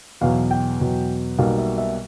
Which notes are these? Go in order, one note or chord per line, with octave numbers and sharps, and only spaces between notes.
E2 B2 F#3 F5
G5
E2 B2 F#3
B1 B2 G3 A#3 F5
E5
E5